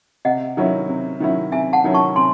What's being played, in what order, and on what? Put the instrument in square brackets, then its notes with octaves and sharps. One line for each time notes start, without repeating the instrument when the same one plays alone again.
[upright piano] C3 [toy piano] D#5 F#5
[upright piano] D#3 F#3 C#4 E4
C3
D#3 F#3 C#4 E4
[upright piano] C3 [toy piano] E5 G#5
[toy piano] F#5 A5
[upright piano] D#3 F#3 C#4 E4
[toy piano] A5 C#6
[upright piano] C3 [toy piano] G#5 C6